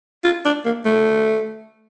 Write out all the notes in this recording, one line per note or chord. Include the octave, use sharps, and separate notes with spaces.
F4
D4
A#3
A3